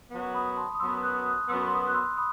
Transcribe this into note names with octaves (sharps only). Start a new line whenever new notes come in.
F#2 F#3 B3
B5 D#6
A5 C6
D#6
F#2 F#3 B3 C6 E6
D#6 F#6
D#6 F#6
F#2 F#3 B3 C6 E6
C6
B5 D#6
F#6
C6 E6
B5 D#6